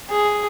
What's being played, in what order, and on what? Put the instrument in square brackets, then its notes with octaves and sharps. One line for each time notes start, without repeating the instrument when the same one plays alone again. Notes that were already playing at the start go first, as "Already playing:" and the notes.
[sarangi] G#4